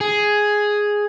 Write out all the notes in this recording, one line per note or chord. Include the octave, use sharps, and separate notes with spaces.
G#4